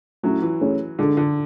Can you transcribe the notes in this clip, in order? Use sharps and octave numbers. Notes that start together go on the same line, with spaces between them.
F#3 A3 C#4 E4
E3
A3 C#4 G#4 C#5
D3 G#3 D4 A4
D3